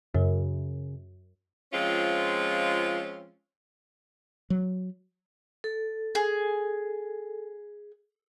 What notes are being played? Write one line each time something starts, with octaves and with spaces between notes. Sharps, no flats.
F#2 C#3
F3 G#3 C4 C#4 F4
F#3
A4
G#4